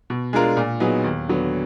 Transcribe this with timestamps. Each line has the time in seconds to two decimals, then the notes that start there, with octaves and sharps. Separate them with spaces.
0.10 B2
0.33 G#3 D4 F4 A#4
0.57 A#2
0.80 F#3 B3 D#4 G#4
1.04 D#2
1.29 D3 F#3 B3